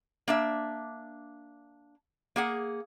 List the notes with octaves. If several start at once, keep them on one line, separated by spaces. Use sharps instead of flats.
A#3 D4 E5
A#3 G#4 F#5